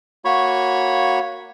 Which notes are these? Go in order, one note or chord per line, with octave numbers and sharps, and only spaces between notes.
A#3 F#4 C#5 B5 C#6